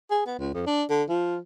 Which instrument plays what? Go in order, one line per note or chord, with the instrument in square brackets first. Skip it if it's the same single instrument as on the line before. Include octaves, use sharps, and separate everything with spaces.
[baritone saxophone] G#4
B3
C#2
F2
D4
D3
F3